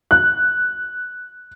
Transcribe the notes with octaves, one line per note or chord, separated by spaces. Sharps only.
F#6